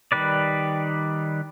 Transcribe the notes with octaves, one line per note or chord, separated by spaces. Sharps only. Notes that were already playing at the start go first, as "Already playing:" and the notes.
D#3 G3 B4 D5